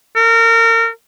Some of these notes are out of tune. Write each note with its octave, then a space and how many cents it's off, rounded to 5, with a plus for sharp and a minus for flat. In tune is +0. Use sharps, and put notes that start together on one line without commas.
A#4 -30